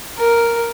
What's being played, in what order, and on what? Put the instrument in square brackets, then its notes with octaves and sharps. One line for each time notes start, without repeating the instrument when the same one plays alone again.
[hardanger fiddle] A#4